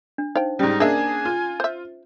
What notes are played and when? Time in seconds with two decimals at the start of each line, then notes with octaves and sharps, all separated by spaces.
0.18 D4
0.35 D#4 C5 F5 G5
0.59 G#2 G3 C#4 D#4
0.80 A#3 D4 G#4 D#5 E5 G#5
1.25 F4
1.60 C5 E5